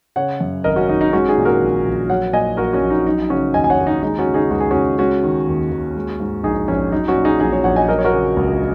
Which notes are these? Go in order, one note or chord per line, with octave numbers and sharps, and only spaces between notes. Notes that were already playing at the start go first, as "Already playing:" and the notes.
C#3 C#5 F#5
F#2
G#1 A#4 D#5
C#4 F#4
G#1 D#4
D#4
G#3 C#4 F#4
D#4 G#4
A#2
F#4 A#4
A#1
A#1
F#3 C#5 F#5
A#2 D#5 G#5
A#1 F#4 A#4
C#4 F#4
A#1
D#4
F#3 D#4
C#3 C#4 F#4
D#2 D#5 G#5
G#5
C#5 F#5
D#2 F#4
D#4
G#3 D#4
C#4 F#4
C#3
D#4 G#4
C#2 F#4
G#4
C#2 C#4 F#4
G#3 C#4 F#4
D#3
D#2
D#2
G#3
G#2
A#1 D#4 G#4
A#1 C#4
F#3 D#4
C#4 F#4
A#2
D#4 G#4
A#1 D#4 G#4
G#4 C#5
A#1 C#5 F#5
D#5 G#5
F#3 A#4 D#5
C#5
F#4 A#4
C#3
C#2